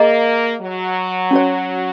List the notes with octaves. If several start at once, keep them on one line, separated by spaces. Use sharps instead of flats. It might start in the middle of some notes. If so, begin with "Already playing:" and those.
Already playing: A#3 G#4 D#5 A#5
F#3
C#4 F#4 C#5